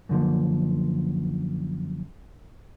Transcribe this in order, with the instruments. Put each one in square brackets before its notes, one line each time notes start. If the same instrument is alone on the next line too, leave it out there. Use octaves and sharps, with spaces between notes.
[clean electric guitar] F#2 D3 F3 A#3